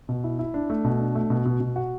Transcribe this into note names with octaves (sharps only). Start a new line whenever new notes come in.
B2
E4
E4
D4
A3
B2
D4
A3
B2
B2
B2
F#4